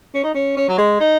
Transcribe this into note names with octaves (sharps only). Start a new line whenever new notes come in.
C#4
D#4
C#4
C#4
F#3
G#3
D#4